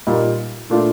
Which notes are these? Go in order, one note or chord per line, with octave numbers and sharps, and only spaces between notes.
A#2 G3 A#3 D#4
A#2 A3 D4 F4